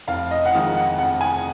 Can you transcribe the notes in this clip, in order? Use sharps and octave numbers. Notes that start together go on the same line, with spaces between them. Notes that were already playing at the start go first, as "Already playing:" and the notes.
F1 F5
D#5
F#5
F2 D#3 G#3 F5
F#5
F1 F#5
G#5